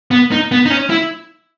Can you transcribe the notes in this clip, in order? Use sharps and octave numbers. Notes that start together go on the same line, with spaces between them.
B3
D#4
B3
D#4
C#4
E4